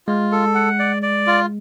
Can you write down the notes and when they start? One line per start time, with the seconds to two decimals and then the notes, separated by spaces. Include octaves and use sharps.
0.07 G#3 F4
0.32 A4
0.55 F#5
0.79 D5
1.03 D5
1.27 F4